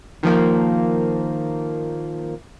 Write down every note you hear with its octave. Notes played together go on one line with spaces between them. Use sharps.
D#3 F3 A#3